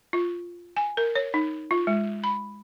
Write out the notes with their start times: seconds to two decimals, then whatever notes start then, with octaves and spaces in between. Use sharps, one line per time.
0.13 F4
0.76 G#5
0.97 A#4
1.15 C#5
1.34 D#4
1.71 F4
1.87 G#3
2.24 B5